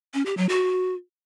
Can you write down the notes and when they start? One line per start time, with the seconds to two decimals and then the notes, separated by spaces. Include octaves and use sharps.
0.14 C#4
0.26 G4
0.37 F#3
0.49 F#4